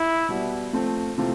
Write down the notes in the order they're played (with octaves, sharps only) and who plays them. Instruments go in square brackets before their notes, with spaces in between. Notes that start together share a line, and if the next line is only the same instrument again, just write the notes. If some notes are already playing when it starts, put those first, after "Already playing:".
Already playing: [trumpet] E4
[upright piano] B2 G3 B3
F3 A3 C4
C3 E3 A3 C4 F4